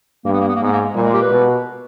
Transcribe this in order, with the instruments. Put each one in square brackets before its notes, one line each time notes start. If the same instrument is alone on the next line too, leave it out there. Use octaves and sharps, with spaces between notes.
[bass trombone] G2 [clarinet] A#3
[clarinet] B3
A#3
B3
A#3
[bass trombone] G#2 [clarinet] B3
[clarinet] A#3
[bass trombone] A#2 [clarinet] G3
[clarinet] G#3
G4
B4
[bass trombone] B2